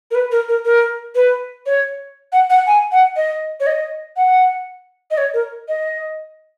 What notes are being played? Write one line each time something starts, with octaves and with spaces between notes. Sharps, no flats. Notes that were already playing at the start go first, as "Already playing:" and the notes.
A#4
B4
A#4
A#4
A#4
B4
C#5
F#5
F#5
G#5
F#5
D#5
C#5
D#5
F#5
D#5
C#5
A#4
D#5